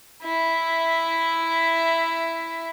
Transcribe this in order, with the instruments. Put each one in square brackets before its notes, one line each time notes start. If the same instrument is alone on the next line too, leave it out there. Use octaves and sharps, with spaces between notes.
[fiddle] E4 E5